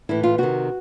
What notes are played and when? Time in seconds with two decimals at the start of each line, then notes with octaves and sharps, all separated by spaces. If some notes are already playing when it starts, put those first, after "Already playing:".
0.09 A2 E3 E4
0.23 F4
0.38 C3 D#3 F#4